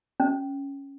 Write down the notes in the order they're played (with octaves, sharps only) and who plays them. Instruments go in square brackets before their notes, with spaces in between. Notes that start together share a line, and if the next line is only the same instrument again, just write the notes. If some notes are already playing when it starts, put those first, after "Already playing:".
[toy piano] C#4